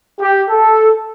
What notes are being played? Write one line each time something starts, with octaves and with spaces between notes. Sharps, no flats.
G4
A4